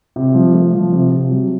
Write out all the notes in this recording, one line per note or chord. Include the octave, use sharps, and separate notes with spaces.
C3
F3
A3
F3
C3
C3
F#3